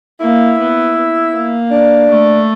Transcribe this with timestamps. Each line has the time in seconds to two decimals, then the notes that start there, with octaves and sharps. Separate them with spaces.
0.20 A#3 E4
0.58 B3
0.96 B3
1.33 A#3
1.71 D4
2.09 A3